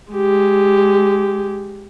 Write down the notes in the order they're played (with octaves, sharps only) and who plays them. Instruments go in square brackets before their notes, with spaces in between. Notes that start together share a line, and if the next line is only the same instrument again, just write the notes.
[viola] G#3 G4